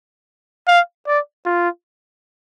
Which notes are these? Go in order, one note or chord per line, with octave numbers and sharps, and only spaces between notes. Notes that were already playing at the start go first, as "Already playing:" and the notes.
F5
D5
F4